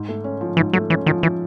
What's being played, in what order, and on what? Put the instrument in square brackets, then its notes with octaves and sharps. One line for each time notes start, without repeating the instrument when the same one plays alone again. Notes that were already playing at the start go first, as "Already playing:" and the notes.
Already playing: [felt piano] G#2
A3
C#4
F3
[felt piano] G#2 [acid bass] E3
[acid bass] F#3 [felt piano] A3
[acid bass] E3 [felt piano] C#4
[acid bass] D#3 [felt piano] F3
[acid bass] E3